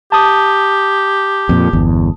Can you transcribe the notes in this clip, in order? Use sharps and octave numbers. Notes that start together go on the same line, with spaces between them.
G4 A5 D#6
F2 A#2
G1 E2